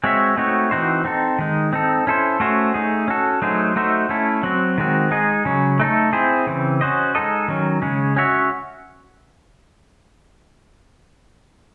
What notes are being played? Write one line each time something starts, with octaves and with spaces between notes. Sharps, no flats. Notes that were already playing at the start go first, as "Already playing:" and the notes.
G#3 C4 F#4 C#5 E5
A3 C4 D#4 F#4 C#5
E3 C4 D#4 F#4 C5
C4 D#4 A4
D#3 G#3 D#4
C4 D#4 A4
C#4 E4 A4 C5
A3 C#4 F#4 C5 E5
A3 D#4 G#4
C#4 F#4 A4
F#3 A3 D#4 G#4 C5
A3 D#4 F#4 C5 E5
A3 C#4 E4 A4
F#3 C4 F#4
D#3 G#3 C4 F#4
G#3 D#4 G#4 D#5
C#3 F#3 C#4
A3 D#4 A4
C4 E4 G#4 C5
C#3 E3 C4
C#4 F#4 C5 D#5
G#3 D#4 A4 D#5
D#3 F#3 C#4
C#3 G#3 C#4
C#4 F#4 C#5 E5